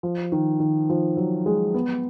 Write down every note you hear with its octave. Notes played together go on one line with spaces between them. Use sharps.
F3
D#3
D#3
F3
F#3
G#3
B3